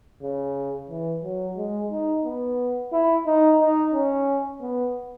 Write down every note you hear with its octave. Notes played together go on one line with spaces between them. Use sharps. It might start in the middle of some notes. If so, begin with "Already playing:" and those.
C#3
E3
F#3
G#3
D#4
B3
E4
D#4
D#4
C#4
B3